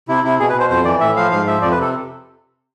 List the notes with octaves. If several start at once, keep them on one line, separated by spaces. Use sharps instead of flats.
C3 E4
C3 E4
B2 G#4
B4
B2
C5
F2 C5
E3 D5
A2 E5
F3 F5
G#2 F5
F3 E5
F2 D5
B4
C3 A4